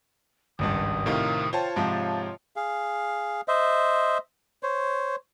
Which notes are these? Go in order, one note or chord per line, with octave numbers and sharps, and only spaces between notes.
G#1 C#2 G2 D#6
A2 C3 D#3 F4 A#4 D#5
F4 C5 C#5 G5 A5
G#2 C3 F3 F5
G#4 F5
C5 D#5 E5
C5 C#5